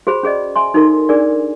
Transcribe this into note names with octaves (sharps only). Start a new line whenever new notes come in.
F#4 G#4 C5 B5
C#4 G#4 D5 D#5
E5 G#5 C6
D#4 F#4 A4 A#4 C6
D4 G#4 A#4 D5 G#5